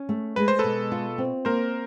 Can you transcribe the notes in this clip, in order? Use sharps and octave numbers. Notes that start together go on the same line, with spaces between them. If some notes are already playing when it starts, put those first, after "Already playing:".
Already playing: C#4
A3
G#3 B4
C5
B2 A4 B4
F4
C4
A#3 A#4 C5